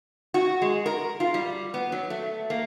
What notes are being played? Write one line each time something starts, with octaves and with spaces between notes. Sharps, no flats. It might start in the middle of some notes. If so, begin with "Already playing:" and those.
F#4
G#3
A#4
F4
G3
B3
F#3
A3
A#3